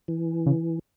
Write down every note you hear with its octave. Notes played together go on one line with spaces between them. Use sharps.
E3
C#3